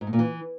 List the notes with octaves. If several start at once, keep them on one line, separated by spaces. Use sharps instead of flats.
G#2
A2
A#2
E3